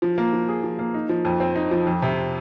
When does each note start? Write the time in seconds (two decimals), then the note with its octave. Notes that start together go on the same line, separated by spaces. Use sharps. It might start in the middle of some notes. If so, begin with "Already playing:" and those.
0.02 F3
0.18 A#3
0.33 F3
0.48 G#4
0.63 F3
0.79 A#3
0.94 D#4
1.09 F3
1.25 F2
1.40 C4
1.56 D#4
1.71 F3
1.87 F2
2.02 C3